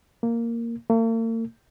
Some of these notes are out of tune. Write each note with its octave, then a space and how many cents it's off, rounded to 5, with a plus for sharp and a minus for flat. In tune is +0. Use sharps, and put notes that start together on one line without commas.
A#3 -5
A#3 -45